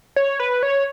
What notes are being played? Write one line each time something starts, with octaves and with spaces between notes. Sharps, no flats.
C#5
B4
C#5